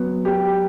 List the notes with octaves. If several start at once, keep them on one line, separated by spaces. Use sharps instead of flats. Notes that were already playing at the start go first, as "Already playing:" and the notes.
Already playing: F#3 B3
G4